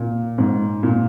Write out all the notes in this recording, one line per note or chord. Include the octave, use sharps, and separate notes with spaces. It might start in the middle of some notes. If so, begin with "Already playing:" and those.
Already playing: A#2
G#2
A#2